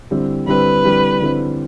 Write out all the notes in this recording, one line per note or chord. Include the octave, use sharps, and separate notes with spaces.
D3 G3 C4 E4
D3 G3 C4 E4 B4
D3 G3 C4 E4
D3 G3 C4 E4